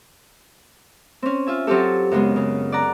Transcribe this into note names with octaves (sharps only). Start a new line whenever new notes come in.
C4 C#4
F4 E5 G#5
F#3 C4 F4 G4 A4
F#2 C#3 G#3 B3
C#3
D5 F#5 A#5